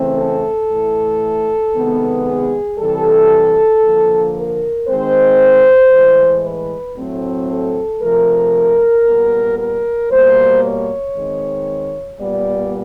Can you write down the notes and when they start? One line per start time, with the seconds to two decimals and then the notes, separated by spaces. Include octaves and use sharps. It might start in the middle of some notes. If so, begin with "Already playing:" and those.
Already playing: C#3 E3 A3 C4
0.18 A4
0.70 A2 E3 A3
1.75 C3 D#3 G#3 B3
2.27 G#4
2.78 C3 E3 G3 A4
3.84 D3 F3 A#3
4.35 A#4
4.88 D#3 G#3 C4 C5
5.92 A2 E3 G#3
6.44 B4
6.97 A2 F#3 A3 C4
7.49 A4
8.01 C3 F3 A3 A#4
9.05 A#2 G3 B3
9.58 A#4
10.11 B2 G3 A#3 C5
10.63 C#5
11.15 D#3 G#3 C4
12.19 A#2 G3 B3 D5